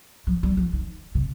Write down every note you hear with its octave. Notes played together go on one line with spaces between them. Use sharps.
F3
G3
F3
D#3
C3